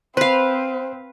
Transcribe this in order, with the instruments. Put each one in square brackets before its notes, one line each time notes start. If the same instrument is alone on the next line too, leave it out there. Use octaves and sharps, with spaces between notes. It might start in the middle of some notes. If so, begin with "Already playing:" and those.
[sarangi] C4 [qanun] B4 F5 [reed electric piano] C5